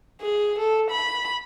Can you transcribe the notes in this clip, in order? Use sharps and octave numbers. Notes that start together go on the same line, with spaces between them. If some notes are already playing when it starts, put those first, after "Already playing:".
G#4
A4
B5